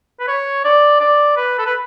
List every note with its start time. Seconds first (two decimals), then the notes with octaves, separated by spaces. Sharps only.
0.20 B4
0.28 C#5
0.65 D5
1.01 D5
1.37 B4
1.59 A4
1.66 B4